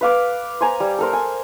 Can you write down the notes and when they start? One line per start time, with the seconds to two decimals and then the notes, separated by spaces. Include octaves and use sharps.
0.01 B4 F5 D6
0.61 C5 G#5 A#5
0.80 G3
0.99 A4 A#4 C5
1.13 G#5